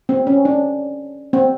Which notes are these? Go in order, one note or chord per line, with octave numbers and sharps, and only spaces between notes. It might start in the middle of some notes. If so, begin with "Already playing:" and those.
C4
C#4
D4
C4